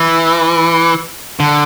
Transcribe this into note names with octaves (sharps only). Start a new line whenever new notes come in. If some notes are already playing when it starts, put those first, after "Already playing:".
Already playing: E3
D3